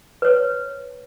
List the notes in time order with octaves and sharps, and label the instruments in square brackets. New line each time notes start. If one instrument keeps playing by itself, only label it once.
[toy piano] B4 C#5